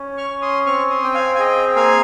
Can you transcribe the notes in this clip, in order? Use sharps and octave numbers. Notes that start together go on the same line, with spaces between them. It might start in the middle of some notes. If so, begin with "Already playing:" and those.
Already playing: C#4
C#6 F6
C#4
C6 D#6
C4 C#6 F6
C6 D#6
C4 G5
F5 G#5
G#5
G#4 D#5 G5
A#3 F5 G#5